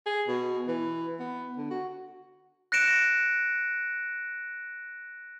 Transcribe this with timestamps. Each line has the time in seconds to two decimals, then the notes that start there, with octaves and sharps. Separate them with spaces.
0.06 G#4
0.28 B2
0.68 E3
1.19 B3
1.56 D3
1.70 F#4
2.72 F#6 A#6 C#7 D7 E7